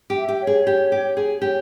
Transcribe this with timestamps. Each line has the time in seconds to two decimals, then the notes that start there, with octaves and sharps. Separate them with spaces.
0.10 G4
0.16 E5
0.29 G4
0.41 C#5
0.47 G#4
0.67 G4
0.92 G4
1.17 G#4
1.42 G4 C#5